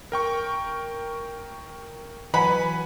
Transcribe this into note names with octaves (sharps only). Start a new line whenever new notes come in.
A#4 G5 C#6
E3 F#3 B4 F#5 G#5 B5